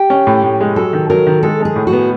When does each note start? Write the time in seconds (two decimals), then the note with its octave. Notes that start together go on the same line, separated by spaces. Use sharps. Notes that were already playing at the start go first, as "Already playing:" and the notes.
Already playing: G4
0.10 C#4
0.27 A2
0.43 A2
0.61 G#3
0.76 F#3 A4
0.93 D#3
1.10 F#3 A#4
1.27 D#3
1.43 G#3 A4
1.60 G#3
1.65 G#4
1.76 A2
1.87 F#4
1.93 B3